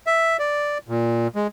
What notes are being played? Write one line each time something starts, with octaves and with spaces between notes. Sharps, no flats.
E5
D5
A#2
G#3